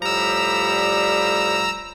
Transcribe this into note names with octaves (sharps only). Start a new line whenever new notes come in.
A2 F3 G3 A#5 E6